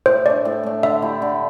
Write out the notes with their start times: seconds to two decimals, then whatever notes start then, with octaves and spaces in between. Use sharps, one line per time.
0.06 A2 C5
0.26 A3 D4 D5
0.45 A2
0.63 A3 D4
0.83 D3 E5
1.02 A3 E4 G4
1.22 D3